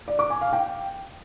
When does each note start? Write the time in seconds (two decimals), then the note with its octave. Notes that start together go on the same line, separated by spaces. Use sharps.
0.08 D5
0.19 D6
0.30 G#5
0.41 F5
0.53 G5